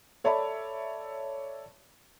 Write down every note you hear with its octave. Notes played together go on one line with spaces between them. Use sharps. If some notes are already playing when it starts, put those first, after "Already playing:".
A4 C#5 D5 E5 A5 B5